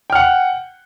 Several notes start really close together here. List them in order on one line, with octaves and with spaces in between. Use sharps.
G5 F6 F#5